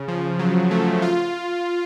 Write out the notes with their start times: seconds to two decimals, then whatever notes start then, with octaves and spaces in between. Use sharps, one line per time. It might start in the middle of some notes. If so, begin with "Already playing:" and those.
Already playing: C#3
0.08 F3
0.39 F#3
0.71 A3
1.02 F4